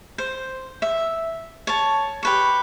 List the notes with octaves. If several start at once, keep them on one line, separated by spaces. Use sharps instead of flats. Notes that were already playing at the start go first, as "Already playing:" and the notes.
C5
E5
C#5 A5
G4 B4 C#6